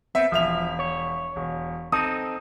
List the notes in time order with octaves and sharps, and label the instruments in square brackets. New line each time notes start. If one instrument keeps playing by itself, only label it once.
[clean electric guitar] B3 C4 [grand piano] E5
[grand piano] E1 E5 F7 [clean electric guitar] F3
[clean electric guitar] C#5
[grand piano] E1
[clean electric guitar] C4 D#4 A4 [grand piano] D#6 D#7